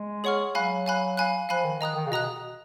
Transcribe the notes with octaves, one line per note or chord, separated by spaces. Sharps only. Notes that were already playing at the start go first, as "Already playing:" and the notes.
Already playing: G#3
G#4 C#5 F#5 C#6 F6
F#3 F5 G#5 B5 F#6
F5 G#5 B5 F#6
F5 G#5 B5 F#6
F3 F5 G#5 B5 F#6
D#3
D#3 D#5 A#5 D#6 F#6
D#3
C#3
B2 D#5 A#5 D#6 F#6